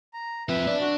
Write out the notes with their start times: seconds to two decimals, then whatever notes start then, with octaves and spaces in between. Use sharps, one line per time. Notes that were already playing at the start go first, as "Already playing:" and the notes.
0.14 A#5
0.49 F3 C4 B4 E5
0.67 D4 D5
0.80 F#4